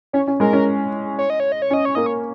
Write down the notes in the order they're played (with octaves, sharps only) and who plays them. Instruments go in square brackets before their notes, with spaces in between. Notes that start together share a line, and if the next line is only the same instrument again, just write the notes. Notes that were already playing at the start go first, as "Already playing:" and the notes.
[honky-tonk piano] C#4 [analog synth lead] C#5
[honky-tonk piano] C#4
[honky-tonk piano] G#3 [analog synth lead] A#4
[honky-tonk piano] C#4
[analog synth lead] C#5
D#5
C#5
D#5
C#5
[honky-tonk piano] C#4
[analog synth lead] D#5
C#5
[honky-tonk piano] A#3 [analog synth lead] D#5
[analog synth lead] C#5